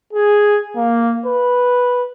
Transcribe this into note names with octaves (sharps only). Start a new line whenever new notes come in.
G#4
A#3
B4